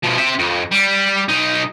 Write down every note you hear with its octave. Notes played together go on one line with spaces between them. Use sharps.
B2 F3
C4 E5
F2
G3
B1 D#4